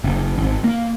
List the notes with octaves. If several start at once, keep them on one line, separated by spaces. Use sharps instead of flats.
F#1
G#1
A#3